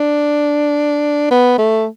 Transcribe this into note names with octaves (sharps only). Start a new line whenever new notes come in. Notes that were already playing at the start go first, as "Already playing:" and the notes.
Already playing: D4
B3
A3